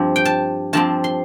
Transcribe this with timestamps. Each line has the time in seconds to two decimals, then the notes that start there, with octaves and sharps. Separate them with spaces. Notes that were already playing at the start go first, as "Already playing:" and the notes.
Already playing: G2 F3 C4
0.16 G5
0.25 A5
0.73 G2 F3 C4 A5
1.04 C6